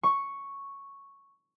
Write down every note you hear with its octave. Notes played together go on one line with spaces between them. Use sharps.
C#6